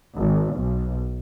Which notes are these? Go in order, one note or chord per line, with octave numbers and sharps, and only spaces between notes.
G#1
B1